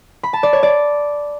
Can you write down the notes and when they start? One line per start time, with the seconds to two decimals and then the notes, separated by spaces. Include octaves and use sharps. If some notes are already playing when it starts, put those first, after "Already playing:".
0.23 B5
0.33 A5
0.43 D5
0.53 C#5
0.63 D5